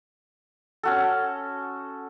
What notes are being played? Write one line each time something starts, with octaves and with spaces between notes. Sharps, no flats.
C#4 F#4 A4